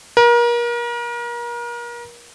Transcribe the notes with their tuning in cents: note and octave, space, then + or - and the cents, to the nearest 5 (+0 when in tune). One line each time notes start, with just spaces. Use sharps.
A#4 +35